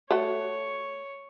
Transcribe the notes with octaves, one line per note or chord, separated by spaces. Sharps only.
A3 F#4 C#5